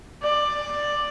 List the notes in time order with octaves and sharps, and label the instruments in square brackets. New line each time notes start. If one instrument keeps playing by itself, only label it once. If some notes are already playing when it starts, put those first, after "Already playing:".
[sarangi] D5